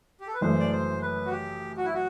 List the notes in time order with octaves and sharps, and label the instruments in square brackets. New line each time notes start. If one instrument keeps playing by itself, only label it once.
[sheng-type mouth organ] G4
A4
B4
[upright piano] F#1 F#2 E3 A3 [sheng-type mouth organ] C5
[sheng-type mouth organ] D5
C5
B4
F#4
G4
F#4
E4
F#4